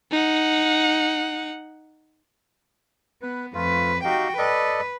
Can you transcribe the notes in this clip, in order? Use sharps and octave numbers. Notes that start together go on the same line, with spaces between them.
D#4 F#5
B3 B4
F2 A3 F4 B4
D#4 F#4 G4 F5 G5
A4 B4 D5 D#5